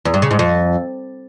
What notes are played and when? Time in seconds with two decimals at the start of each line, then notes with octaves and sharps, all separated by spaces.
0.05 E2
0.14 G2
0.22 C#3
0.31 G#2
0.39 F2